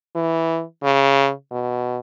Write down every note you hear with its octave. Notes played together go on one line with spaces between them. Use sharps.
E3
C#3
B2